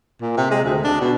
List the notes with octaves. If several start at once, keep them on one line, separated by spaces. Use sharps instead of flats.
A#2
C3
G#3
D2
D4
B2